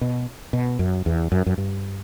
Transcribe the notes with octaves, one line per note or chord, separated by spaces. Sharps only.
B2
B2
F#2
E2
F#2
F#2
G2